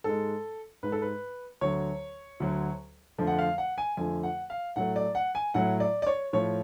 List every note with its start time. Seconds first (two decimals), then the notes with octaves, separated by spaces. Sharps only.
0.04 G#2 G#3 A4
0.83 G#2 G#3 B4
0.92 A4
1.02 B4
1.61 D2 D3 F#3 C#5
2.40 D2 D3 F#3
3.18 F2 D3 F3 A3
3.27 F#5
3.39 F5
3.58 F#5
3.78 G#5
3.97 F2 D3 F3 A3 G#5
4.23 F#5
4.50 F5
4.76 A2 F#3 A3 F#5
4.96 D5
5.15 F#5
5.35 G#5
5.54 A2 F#3 A3 F#5
5.80 D5
6.02 D5
6.07 C#5
6.33 A2 F3 A3 C#5